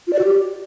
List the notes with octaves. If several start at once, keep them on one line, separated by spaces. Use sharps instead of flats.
F4
D5
F#4
G4